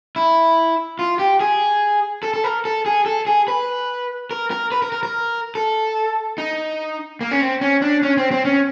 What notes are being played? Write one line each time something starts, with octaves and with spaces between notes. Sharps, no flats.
E4
F4
G4
G#4
A4
A4
A#4
A4
G#4
A4
G#4
B4
A#4
A#4
B4
A#4
A#4
A#4
A4
D#4
A#3
C#4
C4
C#4
D4
C#4
C4
C4
C#4